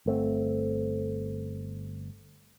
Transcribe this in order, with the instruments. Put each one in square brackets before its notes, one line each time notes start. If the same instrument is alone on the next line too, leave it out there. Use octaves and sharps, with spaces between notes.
[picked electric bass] G1 A3 C4